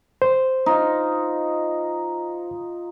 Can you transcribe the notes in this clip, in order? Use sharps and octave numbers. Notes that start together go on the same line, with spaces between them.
C5
D#4 F4